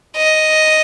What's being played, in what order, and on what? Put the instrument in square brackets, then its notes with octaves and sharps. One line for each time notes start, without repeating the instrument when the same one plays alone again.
[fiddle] D#5